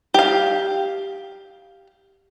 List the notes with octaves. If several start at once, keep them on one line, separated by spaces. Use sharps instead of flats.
G4 F5